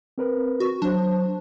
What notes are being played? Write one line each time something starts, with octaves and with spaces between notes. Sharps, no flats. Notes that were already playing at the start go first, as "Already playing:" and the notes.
C4 A#4 B4
F#4
F#3 D4 C5